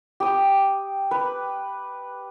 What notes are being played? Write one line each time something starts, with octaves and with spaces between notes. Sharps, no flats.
G4 D#6
B4